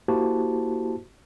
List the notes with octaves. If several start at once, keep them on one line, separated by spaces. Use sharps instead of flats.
A#3 E4 F#4 G4 C5 A5